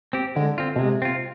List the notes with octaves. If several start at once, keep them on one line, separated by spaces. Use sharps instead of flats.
C4 G4
D3 G#3
C4 F4
B2
C3 G#3
C4 F4